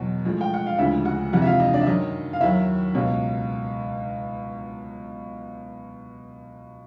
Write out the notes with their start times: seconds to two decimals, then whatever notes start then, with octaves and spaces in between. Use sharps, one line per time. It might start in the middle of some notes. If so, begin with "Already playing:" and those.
Already playing: E2 B2 F#3
0.25 A2 F3 G#3
0.41 G5
0.54 F#5
0.67 F5
0.78 D2 C#3 F3 G#3 E4 E5
1.05 F#4 F#5
1.33 F2 C3 E3 G#3 F#4 F#5
1.42 E5
1.46 F4 F5
1.60 D#4 D#5
1.73 D4 D5
1.81 E5
1.87 F#2 D#3 F#3 D#4 D#5
2.33 F5
2.41 D#2 D#3 F#3 E4 E5
2.94 C#2 B2 F#3